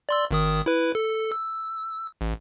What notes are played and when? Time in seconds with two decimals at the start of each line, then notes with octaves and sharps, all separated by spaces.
0.09 D5 C6 E6
0.31 G#1 D#3 D#6
0.66 E4 B4
0.95 A4
1.32 E6
2.21 A1